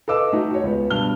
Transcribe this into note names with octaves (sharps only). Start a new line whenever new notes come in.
A4 B4 D#5 F5 D6 E6
A3 D#4 F#4
F#4 C#5
C#2 B3
G2 B2 F6 G7